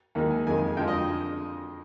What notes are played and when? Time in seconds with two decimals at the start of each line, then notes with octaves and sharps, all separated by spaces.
0.15 D#2 D#3 G#3
0.31 G#5
0.47 F2 D#3 G#3 G#5
0.77 F2 D3 F3 G#3 G5
0.88 D#5